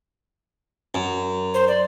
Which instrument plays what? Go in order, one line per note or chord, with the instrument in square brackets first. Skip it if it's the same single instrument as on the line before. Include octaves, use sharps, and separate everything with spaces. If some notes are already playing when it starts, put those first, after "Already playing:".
[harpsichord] F#2
[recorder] C5
D5